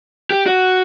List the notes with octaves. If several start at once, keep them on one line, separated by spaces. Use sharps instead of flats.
G4
F#4